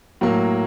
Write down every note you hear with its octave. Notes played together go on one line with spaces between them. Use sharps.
A2 F#3 A#3